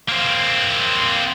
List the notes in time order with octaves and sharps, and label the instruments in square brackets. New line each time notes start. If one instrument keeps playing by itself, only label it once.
[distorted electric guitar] A#3 C4